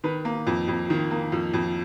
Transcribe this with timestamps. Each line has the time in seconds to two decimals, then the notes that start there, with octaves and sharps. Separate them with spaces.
0.04 D#3 B4
0.25 A#3
0.47 F2
0.68 F2
0.90 D#3
1.11 A#3
1.32 F2
1.54 F2